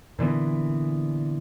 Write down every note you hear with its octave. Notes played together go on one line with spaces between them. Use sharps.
A#2 D3 E3 B3